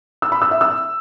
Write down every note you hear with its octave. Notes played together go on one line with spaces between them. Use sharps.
E6
B5
E6
E5
E6